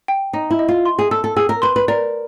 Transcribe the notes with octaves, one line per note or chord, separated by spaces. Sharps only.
G5
D#4 D#5
E4
D#5
F4
C6
G#4
A4 E6
A4
G#4 E6
A#4
B4 C6
B4
A#4 D5